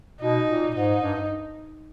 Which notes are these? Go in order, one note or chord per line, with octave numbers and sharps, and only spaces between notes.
B2 D#4
A#2
G#2 D#4
G2